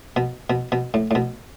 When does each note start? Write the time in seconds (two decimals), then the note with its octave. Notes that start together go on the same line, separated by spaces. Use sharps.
0.16 B2
0.50 B2
0.72 B2
0.94 A2
1.11 A2
1.15 B2